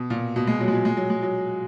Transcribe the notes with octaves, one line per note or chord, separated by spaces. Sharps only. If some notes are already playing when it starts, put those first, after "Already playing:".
Already playing: B2
A#2
B2
G#3
F#3
G#3
F#3
G#3
F#3
G#3
F#3